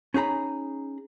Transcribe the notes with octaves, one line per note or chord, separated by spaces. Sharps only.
C#4 D#4 G#4 A#5 B5